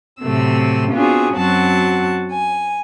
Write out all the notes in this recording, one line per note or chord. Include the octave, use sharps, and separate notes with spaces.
A2 C3 F#3 A3 C4 E6
B3 C4 D4 F4 F#4 G#4
F#2 F#3 C4 F#4 F#5 A5
G#5